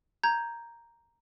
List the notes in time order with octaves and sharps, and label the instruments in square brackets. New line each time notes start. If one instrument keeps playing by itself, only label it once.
[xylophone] A#5 G6 G#6